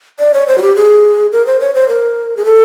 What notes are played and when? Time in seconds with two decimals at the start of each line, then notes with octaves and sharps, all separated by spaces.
0.19 D5
0.34 C#5
0.48 C5
0.58 F#4
0.62 G4
0.76 G#4
1.32 A#4
1.47 C5
1.61 C#5
1.75 C5
1.89 A#4
2.37 G#4
2.45 A4